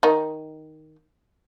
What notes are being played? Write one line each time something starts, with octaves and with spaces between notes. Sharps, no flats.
D#3 D#4